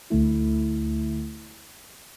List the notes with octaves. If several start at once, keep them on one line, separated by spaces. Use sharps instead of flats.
D2 D3 A3 E4